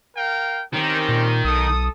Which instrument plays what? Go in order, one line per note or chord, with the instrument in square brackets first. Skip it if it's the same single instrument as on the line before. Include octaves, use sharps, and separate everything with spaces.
[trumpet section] A#4 F5 G5
[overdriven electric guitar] D#3 [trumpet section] C4 C#4 G4
[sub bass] A#2
[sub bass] B1 [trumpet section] A4 D#6